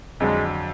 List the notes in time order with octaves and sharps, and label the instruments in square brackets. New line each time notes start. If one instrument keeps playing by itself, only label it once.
[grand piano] F2 D3 F#3 [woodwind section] G#3